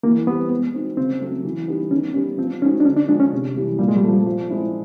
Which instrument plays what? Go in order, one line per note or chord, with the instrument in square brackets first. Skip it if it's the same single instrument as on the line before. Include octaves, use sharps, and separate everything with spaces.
[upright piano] E3 [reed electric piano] A#3
[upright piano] G3 C4 [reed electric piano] B3
[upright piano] G#3
C4 D#4 F#4
[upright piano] C#3 [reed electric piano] C4
[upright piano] F#3 A3
E3
G3 B3 D#4
[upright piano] D#3 [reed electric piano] C#4
[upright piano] G3 B3 [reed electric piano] C#4
[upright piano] F3 [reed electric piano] C4
[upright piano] G#3 C4 D#4 F#4 [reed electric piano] C#4
[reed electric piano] D4
[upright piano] D3 [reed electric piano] C#4
[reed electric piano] D4
[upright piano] F3 G#3 [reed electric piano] D4
[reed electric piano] C#4
[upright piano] C3
E3 G3
[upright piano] A#2 [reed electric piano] G3
[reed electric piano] G#3
G3
[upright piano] F3 A3
F3
G#3 C4 E4